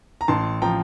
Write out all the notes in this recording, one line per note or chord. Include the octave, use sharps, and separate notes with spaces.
A#5
A1 A5 C6
F3 G5 A#5